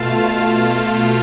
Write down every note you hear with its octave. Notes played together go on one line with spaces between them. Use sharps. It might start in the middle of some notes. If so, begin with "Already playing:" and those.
Already playing: B2 A3 F4 F5 A5
F5
F5